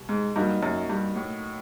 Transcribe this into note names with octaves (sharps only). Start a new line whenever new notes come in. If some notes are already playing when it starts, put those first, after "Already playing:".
Already playing: B2 G3
G#2
G2 F#3 A#3 D#4 F#4
F#2
G2
A2